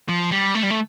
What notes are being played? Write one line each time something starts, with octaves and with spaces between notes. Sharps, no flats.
F3
G3
A3
G3
A3